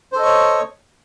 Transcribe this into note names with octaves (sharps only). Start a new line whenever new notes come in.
A4 C5 C#5 D#5 C#6